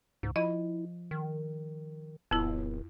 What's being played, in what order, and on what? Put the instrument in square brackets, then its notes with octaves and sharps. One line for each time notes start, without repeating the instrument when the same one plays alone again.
[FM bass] C#2 [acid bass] G#2
[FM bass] F3 [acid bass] E4 [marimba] D#5
[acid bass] D#3
[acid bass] D1 [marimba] F2 E4 [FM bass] B3